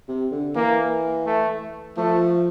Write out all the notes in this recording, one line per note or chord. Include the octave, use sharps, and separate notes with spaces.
C3
D3
E3 A#3
A3
F3 A3